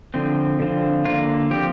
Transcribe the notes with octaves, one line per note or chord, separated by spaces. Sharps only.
D3 F3 C4
D3 F3 C4
D3 A#3 F4
F3 C4 G4